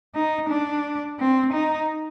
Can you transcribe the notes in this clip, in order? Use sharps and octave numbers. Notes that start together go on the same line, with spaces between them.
D#4
D4
C4
D#4